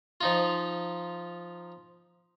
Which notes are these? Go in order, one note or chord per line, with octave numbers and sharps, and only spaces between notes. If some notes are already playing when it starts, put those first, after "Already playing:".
F3 D#4 F4